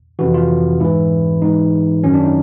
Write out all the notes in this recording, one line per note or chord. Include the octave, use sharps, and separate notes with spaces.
F2 C3 E3 F#4
F4
G#2 E3 E4
G#2 E3 D#4
F#2 D#3 F#3 C#4
D4
D#4